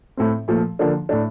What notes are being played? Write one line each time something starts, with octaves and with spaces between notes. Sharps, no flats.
A2 A3 C4
A#2 F3 A3
D3 F3 A#3 D4
A2 A3 D4